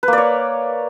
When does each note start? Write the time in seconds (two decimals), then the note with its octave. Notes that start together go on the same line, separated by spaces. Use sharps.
0.03 B4
0.08 A#3
0.13 D5
0.18 C#5